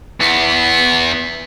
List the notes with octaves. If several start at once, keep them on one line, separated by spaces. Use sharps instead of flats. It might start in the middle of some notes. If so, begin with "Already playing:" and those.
E2 B3